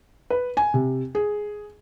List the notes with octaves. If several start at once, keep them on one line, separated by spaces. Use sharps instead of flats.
B4
G#5
C3
G#4